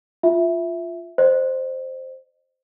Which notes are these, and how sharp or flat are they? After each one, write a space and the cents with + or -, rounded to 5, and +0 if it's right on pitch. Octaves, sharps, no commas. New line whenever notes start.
F4 +0 E5 +0
C5 +0 D#5 -35